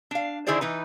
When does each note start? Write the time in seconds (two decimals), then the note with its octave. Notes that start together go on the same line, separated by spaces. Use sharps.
0.11 D4 F5
0.46 D3 D#3 E4 G#4 C5 D5
0.61 E3 D#4 B4